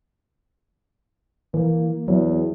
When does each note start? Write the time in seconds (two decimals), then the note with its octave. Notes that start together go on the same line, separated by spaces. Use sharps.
1.54 E3 A#3
2.08 E2 F#3